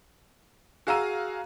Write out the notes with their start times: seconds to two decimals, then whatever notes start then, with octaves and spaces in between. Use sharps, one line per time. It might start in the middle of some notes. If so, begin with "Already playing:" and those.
0.87 F#4 G#4 F5 A#5 E6 D#7